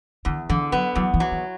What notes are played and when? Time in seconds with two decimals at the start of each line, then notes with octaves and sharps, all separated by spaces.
0.25 E2 D3
0.50 D3 E3
0.72 F#3 B3
0.95 E2 F#3
1.14 E3
1.20 F#3
1.32 E3